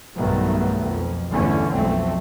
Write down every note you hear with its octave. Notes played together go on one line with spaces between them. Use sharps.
B1 G2 D#3 F#3 A3 B3
F2
G1 E2 D3 E3 A3 C#4
B1 F2 A3 C4